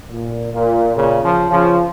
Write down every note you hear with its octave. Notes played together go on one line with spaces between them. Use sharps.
A#2
A#2
A#2 C#3
C#3 F3
C#3 F3